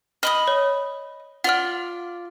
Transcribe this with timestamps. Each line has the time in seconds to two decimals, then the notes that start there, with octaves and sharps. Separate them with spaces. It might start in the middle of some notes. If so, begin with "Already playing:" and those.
0.23 D#5 B5 D#6 F6
0.48 C#5
1.44 F4 D5 F#5 F6